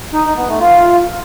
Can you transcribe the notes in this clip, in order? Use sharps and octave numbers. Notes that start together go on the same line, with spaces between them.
D#4
D#4
B3
A3
F4